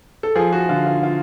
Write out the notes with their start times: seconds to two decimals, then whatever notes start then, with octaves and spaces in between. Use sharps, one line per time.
0.23 A4
0.35 F3 G#4
0.53 F#4
0.69 D3 F4
0.86 F4
1.03 F4